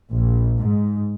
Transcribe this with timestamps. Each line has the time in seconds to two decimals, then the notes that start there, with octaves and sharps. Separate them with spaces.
0.11 A#1
0.58 G#2